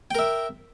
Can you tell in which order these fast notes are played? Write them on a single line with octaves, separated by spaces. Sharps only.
G5 A#4 E5